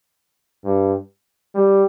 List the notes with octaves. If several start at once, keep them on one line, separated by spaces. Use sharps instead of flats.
G2
G3